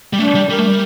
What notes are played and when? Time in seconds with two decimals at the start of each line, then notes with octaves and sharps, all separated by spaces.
0.13 G3
0.19 A3 D4
0.35 G3
0.50 G3 A#4
0.59 A3
0.67 G3